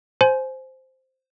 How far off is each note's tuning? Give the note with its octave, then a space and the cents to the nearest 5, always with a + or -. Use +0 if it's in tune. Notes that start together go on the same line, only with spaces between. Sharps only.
C5 +0 G#5 +25